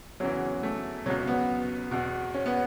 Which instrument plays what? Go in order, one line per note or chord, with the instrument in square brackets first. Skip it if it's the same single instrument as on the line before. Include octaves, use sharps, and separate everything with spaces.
[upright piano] E2 C#3 E3 F#3
A3
B2 F#3
C#2
B3
E2 B2
C#4
B3